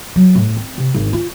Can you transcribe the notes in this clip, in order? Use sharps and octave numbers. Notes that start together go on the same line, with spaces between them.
F#3
A2
C4
C3
G#1 D3
F4